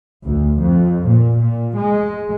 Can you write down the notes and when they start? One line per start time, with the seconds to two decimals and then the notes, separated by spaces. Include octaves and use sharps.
0.25 D2
0.60 F2
1.06 A#2
1.39 A#2
1.77 G#3